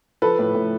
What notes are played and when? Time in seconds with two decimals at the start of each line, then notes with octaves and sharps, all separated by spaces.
0.22 F3 A4 B4
0.39 A2
0.55 A2